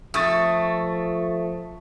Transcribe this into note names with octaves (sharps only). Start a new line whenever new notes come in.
F3 A3 C#6 D#6 A6